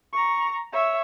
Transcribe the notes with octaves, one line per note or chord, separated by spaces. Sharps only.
A#5 C#6
C#5 E5